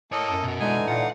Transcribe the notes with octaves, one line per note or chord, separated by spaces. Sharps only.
A#3 E4 A4 C#5 D#5
F#2
B2 F#4
D3 E3 G#3 D#4 G#5
A#2 F4 F#5